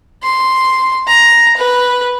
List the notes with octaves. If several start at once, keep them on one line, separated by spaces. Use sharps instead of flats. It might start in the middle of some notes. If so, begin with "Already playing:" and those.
C6
A#5
B4